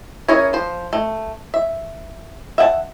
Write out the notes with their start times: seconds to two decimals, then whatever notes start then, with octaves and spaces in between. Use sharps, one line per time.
0.28 C#4 E4 G#4 A#4 C#5
0.53 F3 C5
0.93 A3
1.54 E5
2.58 E5 F#5 G5 A5